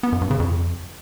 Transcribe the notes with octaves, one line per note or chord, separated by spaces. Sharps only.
B3
F#2
G2
C#3
F2